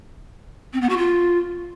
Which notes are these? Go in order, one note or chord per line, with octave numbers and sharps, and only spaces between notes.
C4
B3
F#4
F4